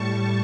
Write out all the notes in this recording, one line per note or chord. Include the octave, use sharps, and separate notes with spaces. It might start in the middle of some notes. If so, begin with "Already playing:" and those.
Already playing: A2 G3 A5 C#6